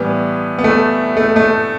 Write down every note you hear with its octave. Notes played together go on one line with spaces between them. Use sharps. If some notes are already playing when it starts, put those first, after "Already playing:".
Already playing: A2 E3 G3 B3
B3
A3
A3
A3